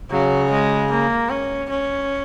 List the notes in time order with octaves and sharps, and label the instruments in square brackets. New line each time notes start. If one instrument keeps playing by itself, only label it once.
[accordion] C#3 [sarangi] F#3
[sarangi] G#3
A#3
C#4
C#4